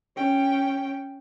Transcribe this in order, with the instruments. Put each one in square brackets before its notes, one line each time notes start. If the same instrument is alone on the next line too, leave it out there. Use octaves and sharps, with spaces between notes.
[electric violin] C#4 G5